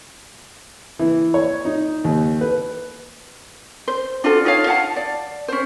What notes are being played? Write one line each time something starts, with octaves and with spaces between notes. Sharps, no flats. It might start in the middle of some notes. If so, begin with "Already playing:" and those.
E3
C#5
D#4
D#2
B4
C5
D4 F4 F#4 A4
D#4 F4 C#5 F5
F5 F#5 A5
D5
C#4 C5